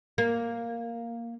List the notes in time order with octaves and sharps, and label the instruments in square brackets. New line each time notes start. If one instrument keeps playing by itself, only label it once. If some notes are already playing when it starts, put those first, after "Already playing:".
[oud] A#3